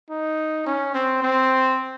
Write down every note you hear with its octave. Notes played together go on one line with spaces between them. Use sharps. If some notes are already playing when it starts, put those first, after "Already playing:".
D#4
C#4
C4
C4